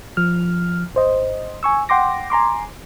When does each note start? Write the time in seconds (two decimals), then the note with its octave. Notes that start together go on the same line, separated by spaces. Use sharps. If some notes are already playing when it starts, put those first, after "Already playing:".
0.17 F3 F6
0.95 G#1 C5 D#5
1.63 G#5 C#6 E6
1.89 F#5 G5 C6 D6 A#6
2.30 G#5 A#5 C6 D6